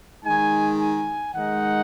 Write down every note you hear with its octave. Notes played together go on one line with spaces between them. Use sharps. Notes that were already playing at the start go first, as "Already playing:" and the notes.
D#3 G#3 D#4 G#5
G#5
D#3 G#3 D#4 F#5